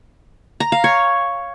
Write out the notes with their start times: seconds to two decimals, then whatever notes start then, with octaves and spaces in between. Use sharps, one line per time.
0.60 A#5
0.72 F5
0.84 C#5